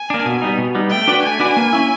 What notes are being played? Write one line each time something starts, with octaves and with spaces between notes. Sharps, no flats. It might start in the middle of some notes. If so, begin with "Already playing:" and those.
Already playing: G#5
A#3 D4
B2
G3 B3 D#4
B2
G3 B3 D#4
A3 G5
D4 F#4 B4 D5
A3 G#5
D4 F#4 B4 D5
A#3
C#4 E4